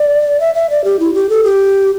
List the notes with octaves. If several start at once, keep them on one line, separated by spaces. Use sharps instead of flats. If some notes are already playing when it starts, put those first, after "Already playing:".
Already playing: D5
E5
E5
D5
G4
E4
G4
A4
G4